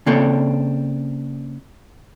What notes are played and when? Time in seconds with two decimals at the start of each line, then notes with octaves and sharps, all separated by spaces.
0.06 C#3 A#3 C4 D4 A4 C#5